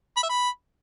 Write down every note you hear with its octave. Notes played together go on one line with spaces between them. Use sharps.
B5
E5
B5